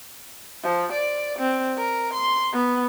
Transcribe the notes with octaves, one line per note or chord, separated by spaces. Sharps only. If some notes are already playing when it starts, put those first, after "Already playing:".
F3
D5
C4
A#4
C6
B3